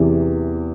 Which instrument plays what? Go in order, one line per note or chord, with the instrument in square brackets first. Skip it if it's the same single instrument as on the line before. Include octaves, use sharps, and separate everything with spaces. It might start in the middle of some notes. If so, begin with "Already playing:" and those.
Already playing: [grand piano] E2 C3 E3